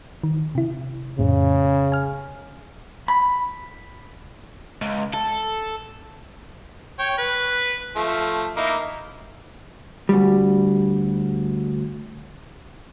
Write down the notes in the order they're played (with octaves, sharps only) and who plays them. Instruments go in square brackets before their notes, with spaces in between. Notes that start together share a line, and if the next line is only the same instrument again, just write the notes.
[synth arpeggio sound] D#3
C3 E4
[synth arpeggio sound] F2 A2 [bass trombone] C#3
[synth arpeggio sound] G#5 F6
[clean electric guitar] B5
[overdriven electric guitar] C#2
A4
[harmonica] C#5 G5
B4
F3 A3
A#3 D#4 E4
[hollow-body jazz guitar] D2 G3